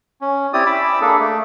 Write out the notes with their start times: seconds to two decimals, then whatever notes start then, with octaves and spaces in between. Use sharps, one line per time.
0.21 C#4
0.53 C4 E4 G4 D5 D#6
0.66 B5 D6 E6
1.01 A#3 D4 G#4 A4
1.20 A3